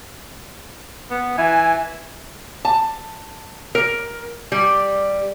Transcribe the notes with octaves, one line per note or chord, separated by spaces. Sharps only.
B3
E3 G#5
A5
A#4
G3